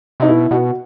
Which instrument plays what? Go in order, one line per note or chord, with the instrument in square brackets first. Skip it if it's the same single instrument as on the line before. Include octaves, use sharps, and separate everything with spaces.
[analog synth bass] C3 [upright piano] D#4
[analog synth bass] B2 [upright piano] E4
[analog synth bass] B2 [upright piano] F#4